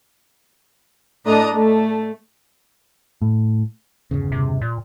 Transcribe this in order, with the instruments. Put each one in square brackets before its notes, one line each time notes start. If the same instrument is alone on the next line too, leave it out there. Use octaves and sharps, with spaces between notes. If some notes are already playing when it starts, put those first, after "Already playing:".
[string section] A2 A3 D4 D#5 A#5 D#6
A3
[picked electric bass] A2
[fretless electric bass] G1 E2 C#3
[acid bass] C3
A#2